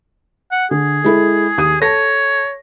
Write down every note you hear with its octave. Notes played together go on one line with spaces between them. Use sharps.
F#5
D3 G#4
G#3 E4 A4
D#2 D#6 D#7
A4 C#5 A5 A#6